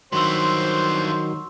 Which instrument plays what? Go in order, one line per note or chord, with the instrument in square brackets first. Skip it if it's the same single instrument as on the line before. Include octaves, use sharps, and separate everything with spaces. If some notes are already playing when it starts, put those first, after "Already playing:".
[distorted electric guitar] G2 E3 [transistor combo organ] D#3 F#3 [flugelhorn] C5 [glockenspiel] C6 C#6 E6